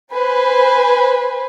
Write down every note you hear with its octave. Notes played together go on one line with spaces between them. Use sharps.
B4 C5 G#5